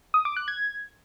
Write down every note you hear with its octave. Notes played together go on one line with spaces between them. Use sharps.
D#6
D6
F#6
G#6